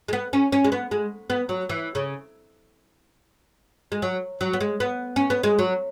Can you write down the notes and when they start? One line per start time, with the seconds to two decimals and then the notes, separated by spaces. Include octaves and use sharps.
0.08 G#3
0.13 B3
0.33 C#4
0.52 C#4
0.65 G#3
0.72 B3
0.91 G#3
1.30 B3
1.49 F#3
1.69 E3
1.95 C#3
3.92 G#3
4.02 F#3
4.41 F#3
4.53 B3
4.60 G#3
4.80 B3
5.16 C#4
5.30 B3
5.43 G#3
5.59 F#3